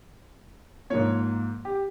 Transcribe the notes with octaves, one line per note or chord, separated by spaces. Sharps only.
G#2 F3 A#3 C#5
G4